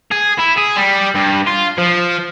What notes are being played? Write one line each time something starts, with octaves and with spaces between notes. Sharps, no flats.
G#4
E4
G#4
G3
G2
F4
F3